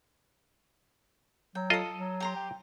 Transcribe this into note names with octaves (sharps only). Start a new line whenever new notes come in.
F#3 G5
F4 A4 D#5 D#6
F#3
G4 A#5 C6
G5